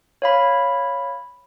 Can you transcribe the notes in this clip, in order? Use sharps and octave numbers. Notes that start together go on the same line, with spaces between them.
C#5 F5 B5